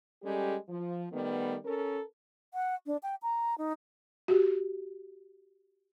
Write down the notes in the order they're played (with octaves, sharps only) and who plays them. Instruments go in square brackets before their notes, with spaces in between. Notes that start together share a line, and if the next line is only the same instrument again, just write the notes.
[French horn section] G3 G#3 C#4 G4 A4
F3
D#3 G3 A3 B3
C#4 A4 A#4
[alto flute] F#5
D4
G5
A#5
D#4
[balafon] F#4 G4